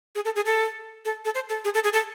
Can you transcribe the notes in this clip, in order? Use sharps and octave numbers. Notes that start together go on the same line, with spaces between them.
G#4
A4
G#4
A4
A4
A4
C5
A4
G#4
A4
G#4
A4